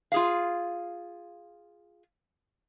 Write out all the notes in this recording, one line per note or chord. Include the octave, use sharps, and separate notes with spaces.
F4 G#4 F5